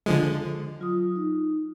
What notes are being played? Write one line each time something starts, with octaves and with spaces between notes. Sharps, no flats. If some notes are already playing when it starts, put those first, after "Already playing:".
D3 F3 G#3
F#3 F4 D#6
D#4